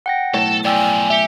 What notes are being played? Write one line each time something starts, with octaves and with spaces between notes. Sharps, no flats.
F#5 G5 A#6
B1 A2 A4 C#5 A5
E2 F3 D5 G5 G#5 E6
G4 E5 C#7